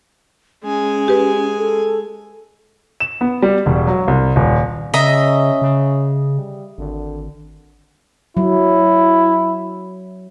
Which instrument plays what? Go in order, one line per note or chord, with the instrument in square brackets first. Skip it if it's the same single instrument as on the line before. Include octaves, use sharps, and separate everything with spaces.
[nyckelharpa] G#3 G#5 [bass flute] C#4
[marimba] G4 B4
[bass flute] A4
[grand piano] E7
B3
G3
E1
F#3
C2
D#1
[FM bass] C#3 [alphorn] C#4 [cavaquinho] D#5 E5 A#5
[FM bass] C#3
[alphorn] G3
[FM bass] G#1 [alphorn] D3
[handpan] F#3 [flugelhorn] E4